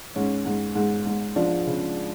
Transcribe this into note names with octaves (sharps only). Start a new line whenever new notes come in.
G#2 C#4
G#2
G#2
G#2
F3 D4
C#3